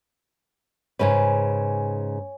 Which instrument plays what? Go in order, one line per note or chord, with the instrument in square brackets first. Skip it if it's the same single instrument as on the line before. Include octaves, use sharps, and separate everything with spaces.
[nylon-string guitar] G#2 C#3 B4 [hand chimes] C#5 G#5